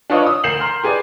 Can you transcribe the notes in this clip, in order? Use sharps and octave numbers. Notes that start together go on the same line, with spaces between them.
D4 F4 B4 C#5 D#5
D#6 E6
D2 A#4 G6 C7 E7 F#7
A#5 C6 F6
G4 G#4 B4 D5